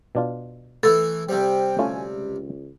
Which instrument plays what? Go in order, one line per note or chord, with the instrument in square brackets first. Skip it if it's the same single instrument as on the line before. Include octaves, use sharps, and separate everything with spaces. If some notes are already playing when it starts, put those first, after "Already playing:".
[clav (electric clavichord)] B2 D4 F4
[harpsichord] E3 A3 E4 [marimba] A4
[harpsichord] C3 G3 [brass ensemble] C5 G5
[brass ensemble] D2 G#5 [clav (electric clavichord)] A3 C#4 F4
[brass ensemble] C#2